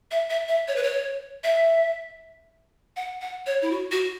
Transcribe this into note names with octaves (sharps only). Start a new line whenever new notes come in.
E5
E5
E5
C#5
B4
C#5
E5
F#5
F#5
C#5
E4
F#4
F#4